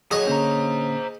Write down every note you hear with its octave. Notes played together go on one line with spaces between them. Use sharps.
A2 F#3 G#4 C#5 D#5
D3 A#3 C#4 C5 A#5